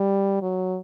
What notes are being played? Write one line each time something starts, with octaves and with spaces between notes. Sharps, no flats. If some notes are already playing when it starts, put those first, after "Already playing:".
Already playing: G3
F#3